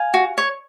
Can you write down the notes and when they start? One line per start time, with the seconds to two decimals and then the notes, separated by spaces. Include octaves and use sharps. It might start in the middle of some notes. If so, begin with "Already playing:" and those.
Already playing: F5 G#5
0.14 F#4
0.38 C#5